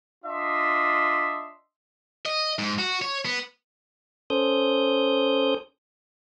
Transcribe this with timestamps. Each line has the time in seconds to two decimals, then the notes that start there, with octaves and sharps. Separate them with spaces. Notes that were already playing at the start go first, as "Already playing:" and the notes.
0.25 D4 F4 D#5 E5 C6
2.26 D#5
2.59 G#2
2.79 F#4
3.02 C#5
3.25 B3
4.30 C#4 A4 C5 D#6 G6